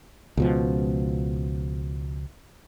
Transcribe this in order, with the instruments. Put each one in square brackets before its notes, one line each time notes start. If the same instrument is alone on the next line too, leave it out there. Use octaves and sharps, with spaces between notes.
[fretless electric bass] C#2 B2 F3